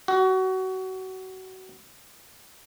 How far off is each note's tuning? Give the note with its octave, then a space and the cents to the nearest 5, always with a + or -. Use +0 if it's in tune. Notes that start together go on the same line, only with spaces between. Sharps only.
F#4 +25